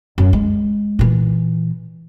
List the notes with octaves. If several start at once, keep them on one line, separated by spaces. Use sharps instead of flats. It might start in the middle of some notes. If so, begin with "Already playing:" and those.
F#2
G#3
A#2 E3